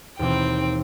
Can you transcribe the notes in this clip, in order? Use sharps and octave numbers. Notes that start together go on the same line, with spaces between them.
D#2 B2 E3 C4 G5